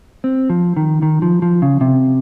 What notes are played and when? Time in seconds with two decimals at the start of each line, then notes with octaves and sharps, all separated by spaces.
0.24 C4
0.50 F3
0.77 D#3
1.02 D#3
1.22 F3
1.42 F3
1.62 C#3
1.81 C3